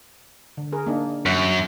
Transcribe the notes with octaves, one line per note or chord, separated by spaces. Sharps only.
D3
G#4 A#4
A#3 D4 D#4
F#2